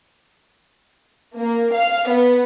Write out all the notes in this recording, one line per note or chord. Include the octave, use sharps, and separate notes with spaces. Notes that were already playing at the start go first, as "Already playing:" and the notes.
A#3
F5
B3